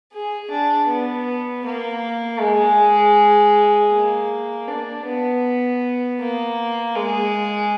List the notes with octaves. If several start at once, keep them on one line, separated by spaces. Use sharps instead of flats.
G#4
D4
B3
A#3
G#3
A#3
D4
B3
A#3
G#3